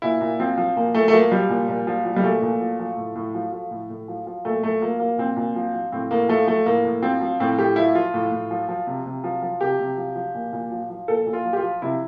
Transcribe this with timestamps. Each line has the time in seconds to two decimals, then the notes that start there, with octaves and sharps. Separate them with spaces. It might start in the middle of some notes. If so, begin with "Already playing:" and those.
0.02 A#2 E4
0.21 A#2
0.40 F3 C4
0.57 F3
0.76 A#2 A#3
0.94 A#2 A3
1.08 A3
1.13 F3 A#3
1.32 F3 G3
1.49 A#2
1.69 A#2
1.87 F3
2.06 F3
2.16 G3
2.23 A#2 A3
2.42 A#2
2.61 F3
2.80 F3
2.97 A2
3.15 A2
3.35 F3
3.52 F3
3.71 A2
3.90 A2
4.08 F3
4.27 F3
4.45 A#2 A3
4.63 A#2 A3
4.82 F3 A#3
4.99 F3 A#3
5.18 A#2 C4
5.36 A#2
5.56 F3
5.74 F3
5.92 A2 C4
6.11 A2 A#3
6.29 F3 A3
6.48 F3 A3
6.66 A2 A#3
6.85 A2
7.02 F3 C4
7.21 F3
7.40 A2 C4
7.58 A2 G4
7.76 F3 E4
7.95 F3 F4
8.14 A2
8.32 A2
8.51 F3
8.69 F3
8.87 C3
9.06 C3
9.24 F3
9.42 F3
9.61 C3 G4
9.79 C3
9.97 F3
10.15 F3
10.34 A#2
10.53 A#2
10.71 F3
10.90 F3
11.08 A#2 A4
11.26 A#2
11.33 F4
11.45 F3
11.53 G4
11.57 F4
11.63 F3
11.82 C3 E4